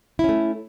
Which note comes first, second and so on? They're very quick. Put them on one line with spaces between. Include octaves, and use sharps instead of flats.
E4 C#4 A3